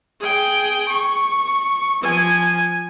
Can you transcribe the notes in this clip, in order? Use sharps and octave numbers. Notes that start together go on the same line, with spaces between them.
G#4 G5
C#6
F3 G#5